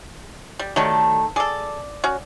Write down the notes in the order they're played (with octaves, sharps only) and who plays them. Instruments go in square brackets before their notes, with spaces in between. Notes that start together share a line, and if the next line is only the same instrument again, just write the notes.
[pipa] G3
[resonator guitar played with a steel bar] D#3 A3 A4 [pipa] F#3 G3
[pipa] G#4 A4 [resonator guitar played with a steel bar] D5
[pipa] C#4 F#4